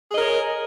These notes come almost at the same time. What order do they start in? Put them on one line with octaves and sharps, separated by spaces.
G#4 D#5 A#4 C#5